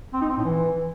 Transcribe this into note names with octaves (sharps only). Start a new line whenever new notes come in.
C4
D#4
C4
A2
E3